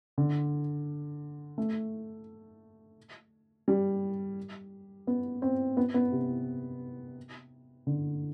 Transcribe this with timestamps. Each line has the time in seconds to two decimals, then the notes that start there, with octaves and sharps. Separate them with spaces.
0.18 D3
1.58 A3
3.68 G3
5.07 B3
5.42 C4
5.77 B3
5.94 B3
6.12 C3
7.87 D3